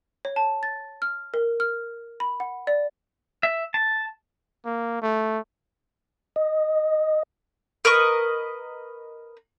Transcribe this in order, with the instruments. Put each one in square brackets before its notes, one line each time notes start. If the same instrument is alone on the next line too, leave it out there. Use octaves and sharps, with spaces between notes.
[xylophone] C#5
A5
A6
F6
A#4
F6
B5
F#5
D5
[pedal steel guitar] E5
A5
[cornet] A#3
A3
[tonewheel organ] D#5
[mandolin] A#4 B4 D#5 C#6